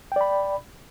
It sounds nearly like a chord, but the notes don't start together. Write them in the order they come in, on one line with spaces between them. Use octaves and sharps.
G5 D5 B5